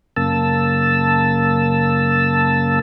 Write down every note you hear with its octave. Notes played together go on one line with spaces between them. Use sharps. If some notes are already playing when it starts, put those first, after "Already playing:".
F#2 C#3 A#3 A5 E6